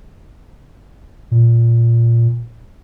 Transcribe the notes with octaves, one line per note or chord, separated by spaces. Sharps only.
A#2